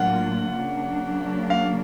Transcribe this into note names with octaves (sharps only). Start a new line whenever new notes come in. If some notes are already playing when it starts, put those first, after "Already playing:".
Already playing: A2 F#3 A#3 D4 F4 F#5
C#3 F#3 A#3 D4
F5